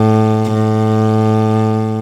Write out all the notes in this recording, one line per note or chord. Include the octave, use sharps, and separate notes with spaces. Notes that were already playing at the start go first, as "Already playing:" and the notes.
Already playing: A2
A2